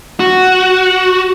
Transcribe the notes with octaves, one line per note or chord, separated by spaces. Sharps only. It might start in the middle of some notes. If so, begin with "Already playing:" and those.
F#4